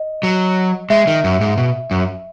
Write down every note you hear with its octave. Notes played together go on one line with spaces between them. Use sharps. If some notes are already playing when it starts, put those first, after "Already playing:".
Already playing: D#5
F#3
G#3 E5
D#3
F#2
G#2
B2
F#2